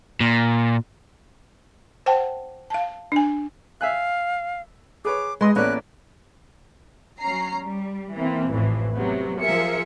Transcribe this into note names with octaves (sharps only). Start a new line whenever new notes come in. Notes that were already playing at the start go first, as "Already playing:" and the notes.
A#2
C5 F#5 G5 A5
F5 A5
D4 G#5
E5 F5 G#5 F#6
G#4 B4 C#5 D6
G#3 B4 D#5 C6 D#6
A1 A#3 B3 C#4 D5 F#6
F#3 C#4 A#5 C7
G3
E3 A#3 C4
A1 F2 A2 E3
C3 F#3 B3
F3 G#4 A#4 E5 C#7